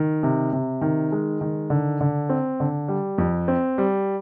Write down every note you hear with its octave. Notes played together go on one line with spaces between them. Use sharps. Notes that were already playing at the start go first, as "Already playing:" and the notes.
Already playing: D#3
C3
C3
D#3
G#3
D#3
D3
D3
C4
D3
G3
F2
C4
G3